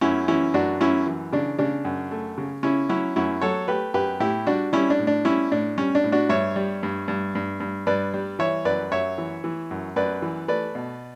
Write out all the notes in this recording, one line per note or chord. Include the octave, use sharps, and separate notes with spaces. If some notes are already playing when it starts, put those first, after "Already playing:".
F#2 C#4 E4
E3 C#4 E4
F#2 D4 F#4
F#2 C#4 E4
E3
C#3 D4
C#3 D4
F#2
A3
C#3
C#3 C#4 E4
F#3 C#4 E4
F#2 C#4 E4
F#3 A4 C#5
A3 G4 B4
F#2 G4 B4
A2 E4 G4
G3 D4 F#4
G3 C#4 E4
D4
A2
D4
G3 C#4 E4
A2 D4
G3 C#4
D4
A2
D4 F#4
G2 C#5 E5
G3
G2
G2
G2
G2
G2 B4 D5
G3
E3 C#5 E5
F#2 B4 D5
F#2 C#5 E5
E3
E3
F#2
F#2 B4 D5
E3
A3 B4 D5
B2